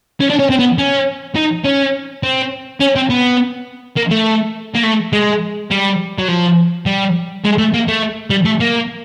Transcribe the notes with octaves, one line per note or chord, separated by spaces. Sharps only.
C#4
D4
C#4
C4
B3
C#4
D#4
C#4
C4
C#4
C4
B3
A#3
A3
A#3
A3
G#3
G3
F#3
F3
G3
G#3
A3
A#3
A3
G3
A3
A#3